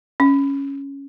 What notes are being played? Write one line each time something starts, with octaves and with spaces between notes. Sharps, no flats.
C#4